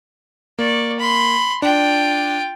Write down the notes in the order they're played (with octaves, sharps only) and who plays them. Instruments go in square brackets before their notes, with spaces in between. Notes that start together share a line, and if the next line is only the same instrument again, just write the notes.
[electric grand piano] A#3 [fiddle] D5 C#6
[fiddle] B5 C6
[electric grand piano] D4 [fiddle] F4 G5